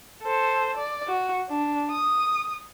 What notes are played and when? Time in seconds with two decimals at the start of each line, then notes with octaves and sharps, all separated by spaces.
0.23 A4 C5
0.77 D5
1.08 F#4
1.49 D4
1.91 D#6